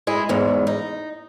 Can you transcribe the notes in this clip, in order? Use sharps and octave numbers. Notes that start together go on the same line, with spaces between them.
G#3 E4 G#4
E2 G#2
D#4